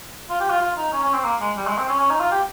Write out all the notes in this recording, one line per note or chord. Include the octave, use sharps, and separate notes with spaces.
F4
G4
F4
F4
D#4
C#4
C#4
C4
A#3
G#3
G3
G#3
C4
C#4
C#4
D#4
F4
G4